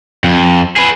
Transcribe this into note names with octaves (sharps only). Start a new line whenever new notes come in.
F2
G#4 B4